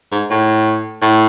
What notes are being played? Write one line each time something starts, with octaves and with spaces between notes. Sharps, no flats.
G#2
A2
A2